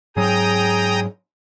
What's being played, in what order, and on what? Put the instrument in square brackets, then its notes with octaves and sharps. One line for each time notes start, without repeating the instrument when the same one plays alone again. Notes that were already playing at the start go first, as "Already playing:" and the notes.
[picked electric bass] G#2 F#3 [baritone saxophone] G#4 [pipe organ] G5 A#5 D#6